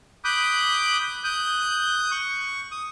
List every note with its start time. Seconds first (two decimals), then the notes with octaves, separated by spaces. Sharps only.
0.24 B5 D6 D#6 F#6 G6
1.24 D#6 F#6 G6
2.11 C#6
2.71 D#6